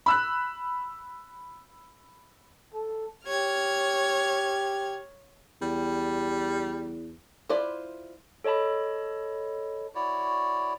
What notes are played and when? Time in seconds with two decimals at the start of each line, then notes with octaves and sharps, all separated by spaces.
0.06 B5 E6 F#6
2.74 A4
3.27 G4 C#5 F6 G#6
5.62 E2 G3
7.49 E4 F4 B4 C5 D5
8.44 A4 C#5 D#5 A5 B5
9.95 E4 F#4 C#5 D5